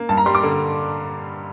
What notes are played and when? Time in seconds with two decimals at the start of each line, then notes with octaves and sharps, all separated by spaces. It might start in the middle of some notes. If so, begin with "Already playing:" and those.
Already playing: A#3
0.09 G2 A5
0.17 A#5
0.26 G3 C6
0.35 D6
0.43 D3